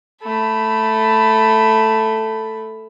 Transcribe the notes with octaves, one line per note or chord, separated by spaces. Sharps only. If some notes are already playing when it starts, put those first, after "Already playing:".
A3 B5